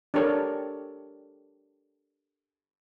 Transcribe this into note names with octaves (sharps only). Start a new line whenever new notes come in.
D4 G4 A4 A#4 C#5 D5